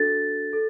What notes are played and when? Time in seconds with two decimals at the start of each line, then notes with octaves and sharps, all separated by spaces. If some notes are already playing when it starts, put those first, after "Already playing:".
Already playing: D4 F#4 A4 A6
0.53 A4